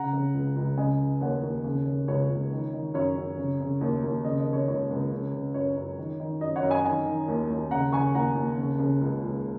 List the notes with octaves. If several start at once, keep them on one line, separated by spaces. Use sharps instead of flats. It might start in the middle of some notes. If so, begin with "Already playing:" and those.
Already playing: C#3 F#5 A#5
C#3
C#2
C#2
C#3 D#5 G#5
C#3
D#2 C#5 F#5
D#2
C#3
C#3
C#2 C#5
C#2
D#3
D#3
F#2 C#5
F#2
C#3
C#3
D#2
D#2
C#3 D#5
D#5
C#3
C#5
C#2 C#5
C#2
C#3
C#3
F#2 C#5
F#2
D#3
D#3
F#2 D#5
C#5 F#5
F#2
D#5 G#5
D#3 D#5 G#5
D#3
D#2
D#2
C#3 F#5 A#5
C#3 G#5 C#6
D#2 F#5 A#5
D#2
C#3
C#3
C#2
C#2